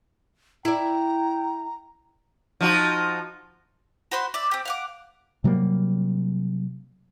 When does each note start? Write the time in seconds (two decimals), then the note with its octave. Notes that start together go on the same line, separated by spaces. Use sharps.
0.65 E4 D5 G5 A#5
2.61 F3 D#4 F#4
4.11 F#4 C5 B5 C6
4.34 D5 E5
4.51 C4 G4
4.65 F5 F#5 D6
5.44 C3 F#3 G3 A#3